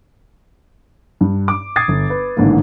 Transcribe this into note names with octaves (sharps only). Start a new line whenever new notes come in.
G2
D6
D#6 G#6 A6 C7
G1
B4
A1 G#2 D3 D#3 A#3